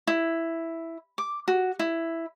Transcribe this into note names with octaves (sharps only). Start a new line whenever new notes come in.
E4
D6
F#4
E4